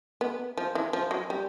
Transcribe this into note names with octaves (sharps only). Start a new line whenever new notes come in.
B3
F3
E3
F3
F#3
G3